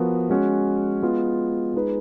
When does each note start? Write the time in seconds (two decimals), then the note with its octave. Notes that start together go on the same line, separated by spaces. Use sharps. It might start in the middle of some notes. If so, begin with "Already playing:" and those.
Already playing: F3 B3 F#4 A#4
0.30 G#3 C#4 F#4
1.02 G#3 B3 F4
1.74 G#3 D#4 G#4 B4